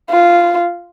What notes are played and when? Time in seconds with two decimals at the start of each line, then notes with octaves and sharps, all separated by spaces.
0.10 F4